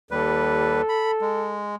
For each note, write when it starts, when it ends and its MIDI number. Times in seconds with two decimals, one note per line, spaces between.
0.11 0.82 39
0.11 0.82 55
0.11 1.61 69
0.11 0.82 71
0.89 1.11 83
1.21 1.76 56